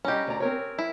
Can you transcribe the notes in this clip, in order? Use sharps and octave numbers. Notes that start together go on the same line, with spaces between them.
G3 C#4 G4 D#5 A#5
D2 D5 A#5
C4 A#4 C#5
E4